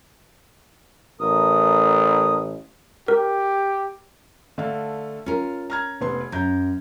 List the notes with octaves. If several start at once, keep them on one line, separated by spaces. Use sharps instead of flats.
A1 A3 A#4 D#6
G4 A#4
D3 A3 F5
C#4 F4 A#4
A#5 F6 G#6
F1 B3 C6
F#2 A#5 G6